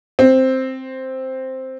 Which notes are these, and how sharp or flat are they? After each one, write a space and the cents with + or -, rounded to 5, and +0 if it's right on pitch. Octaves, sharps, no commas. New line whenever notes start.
C4 +5